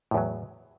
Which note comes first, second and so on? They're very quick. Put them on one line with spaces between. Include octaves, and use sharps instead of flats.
A2 E2 F#3